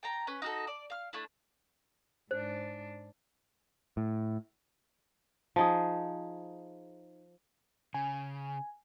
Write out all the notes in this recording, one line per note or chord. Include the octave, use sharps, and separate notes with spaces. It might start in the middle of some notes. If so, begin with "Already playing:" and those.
G5 A5 A#5
C#4 B4
D#4 F#4 A4
D5
F5 F6
A3 D4 E4
G#2 D4 C5
A2
F3 D#4 G#4
C#3 G#5